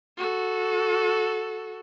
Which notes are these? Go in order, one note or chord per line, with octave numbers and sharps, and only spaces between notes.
F#4 A4